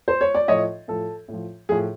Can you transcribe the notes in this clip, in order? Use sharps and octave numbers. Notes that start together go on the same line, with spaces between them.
C5
C#5
D5
A2 F3 C#5 D#5
A2 F3 A4
A2 F3
A2 F3 G#4